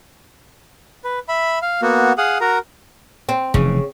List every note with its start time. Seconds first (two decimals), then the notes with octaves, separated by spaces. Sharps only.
1.04 B4
1.28 E5 B5
1.62 F5
1.82 A#3 B3 F#4
2.18 G#4 F5 F#5 D#6
2.41 F#4 A#4 A#5
3.29 C4
3.54 F1 C#3 E3